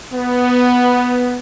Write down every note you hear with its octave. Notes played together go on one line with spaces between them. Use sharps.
B3